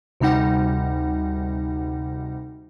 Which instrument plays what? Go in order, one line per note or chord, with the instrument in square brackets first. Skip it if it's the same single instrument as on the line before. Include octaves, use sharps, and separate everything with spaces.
[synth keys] D2 C3 G3 D#4 F#5